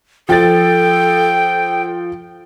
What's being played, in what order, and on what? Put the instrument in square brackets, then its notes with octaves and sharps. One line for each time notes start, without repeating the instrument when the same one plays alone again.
[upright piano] F3 A6 [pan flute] A4 [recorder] G5